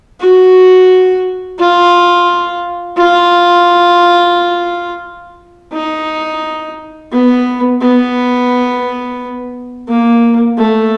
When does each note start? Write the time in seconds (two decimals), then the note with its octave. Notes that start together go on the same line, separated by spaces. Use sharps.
0.20 F#4
1.59 F4
2.97 F4
5.73 D#4
7.12 B3
7.81 B3
9.89 A#3
10.58 A3